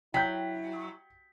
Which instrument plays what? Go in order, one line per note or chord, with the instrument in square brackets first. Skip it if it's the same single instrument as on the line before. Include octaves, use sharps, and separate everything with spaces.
[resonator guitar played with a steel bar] F#3 [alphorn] E4 [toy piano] G5 [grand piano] G6 B6